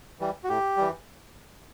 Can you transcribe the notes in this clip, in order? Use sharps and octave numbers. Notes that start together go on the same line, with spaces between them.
E3 G3
F#4
A2 G4
E3 G3